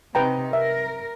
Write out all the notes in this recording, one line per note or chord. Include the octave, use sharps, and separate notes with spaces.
C3 D#4 B4 G5 A#5
A#4 E5